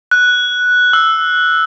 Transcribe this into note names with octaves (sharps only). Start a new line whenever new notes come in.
F#6
E6